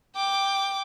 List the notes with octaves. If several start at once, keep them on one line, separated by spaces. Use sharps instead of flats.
G5 D6